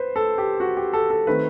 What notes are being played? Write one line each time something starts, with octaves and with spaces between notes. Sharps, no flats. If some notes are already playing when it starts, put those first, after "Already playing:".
Already playing: B4 C5
A4
G4
F#4
G4
A4
A4
D#3 A3 C4 B4